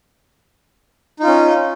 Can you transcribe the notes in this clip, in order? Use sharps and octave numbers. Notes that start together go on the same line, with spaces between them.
C#4 D#4 F4